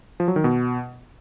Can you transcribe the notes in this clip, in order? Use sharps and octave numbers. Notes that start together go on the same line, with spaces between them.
F3
F#3
D#3
B2